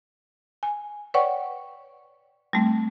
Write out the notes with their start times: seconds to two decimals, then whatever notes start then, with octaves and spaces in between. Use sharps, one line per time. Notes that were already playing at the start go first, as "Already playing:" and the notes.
0.63 G#5
1.14 B4 C#5 D5 F#5 G5 C#6
2.53 G3 A3 C4